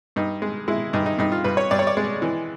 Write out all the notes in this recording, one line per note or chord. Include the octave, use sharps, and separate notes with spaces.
G2 D#4
G#3
G#3 E4
G2 D#4
D#4
G2 D#4
F4
G2 B4
C#5
G2 D5
C#5
D5
G#3
E3